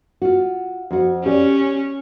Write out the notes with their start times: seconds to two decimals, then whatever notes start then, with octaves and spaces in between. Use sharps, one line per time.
0.22 F4 F#4
0.91 F2 F#4
1.26 C#4 G4 D5